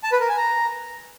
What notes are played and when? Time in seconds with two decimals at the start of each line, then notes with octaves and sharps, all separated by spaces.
0.04 A5
0.12 B4
0.21 A#4
0.29 G#5
0.37 A#5